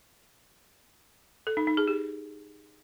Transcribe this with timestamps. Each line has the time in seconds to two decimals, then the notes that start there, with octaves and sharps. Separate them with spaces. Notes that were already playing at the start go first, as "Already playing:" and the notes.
1.47 A4
1.57 D#4
1.67 D#4
1.77 G#4
1.88 G4